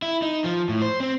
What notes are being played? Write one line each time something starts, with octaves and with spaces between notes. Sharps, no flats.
E4
D#4
F3
A2
C5
C4